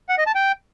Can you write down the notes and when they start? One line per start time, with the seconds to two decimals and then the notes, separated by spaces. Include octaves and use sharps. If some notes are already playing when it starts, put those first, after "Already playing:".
0.09 F#5
0.18 D#5
0.27 A5
0.35 G5